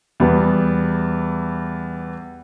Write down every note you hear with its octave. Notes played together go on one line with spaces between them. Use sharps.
E2 G3 B3